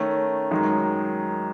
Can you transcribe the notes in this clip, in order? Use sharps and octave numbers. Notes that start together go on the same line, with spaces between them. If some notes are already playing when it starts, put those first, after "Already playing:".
Already playing: D#3 A3 C#4
F#2 D#3 G#3 D#4